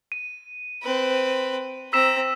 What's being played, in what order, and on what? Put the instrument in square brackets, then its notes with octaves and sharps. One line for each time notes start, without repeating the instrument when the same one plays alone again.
[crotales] D#7
[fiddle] C4 B4
[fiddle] C4 A#5 [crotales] E6 B6 E7